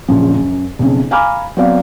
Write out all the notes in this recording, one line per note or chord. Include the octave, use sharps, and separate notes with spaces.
A#1 F#2 C#3 F3
F#2
B1 F2 C#3
F5 G#5 A#5 B5 D6 F6
F#3 B3 C4 D5 F5